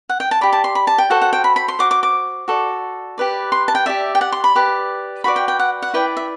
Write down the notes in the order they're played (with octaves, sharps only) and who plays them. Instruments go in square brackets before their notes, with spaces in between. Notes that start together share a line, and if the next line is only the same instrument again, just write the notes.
[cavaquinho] F#5
G5
A5
G4 D5 B5
A5
C6
B5
A5
G5
F#4 A4 C5 F#5
F#5
G5
B5
B5
C6
F#4 C5 D6
D6
D6
F#4 A4 D5
G4 B4 D5
C6
A5
G5
G4 D5 E5
G5
F#5
C6
B5
G4 B4 D5
F#4 B4 D5 B5
G5
G5
F#5
F#5
E4 B4 D5 G5
E5